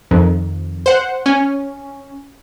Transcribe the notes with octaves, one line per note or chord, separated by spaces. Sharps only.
F2 D#3
C5 F#5
C#4